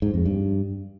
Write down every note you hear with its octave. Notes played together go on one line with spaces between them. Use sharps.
G#2
F2
G2